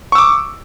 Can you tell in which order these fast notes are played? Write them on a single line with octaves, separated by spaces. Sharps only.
C#6 E6 D6